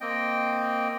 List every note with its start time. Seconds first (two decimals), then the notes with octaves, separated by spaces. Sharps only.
0.01 A#3 C4 D#5 G5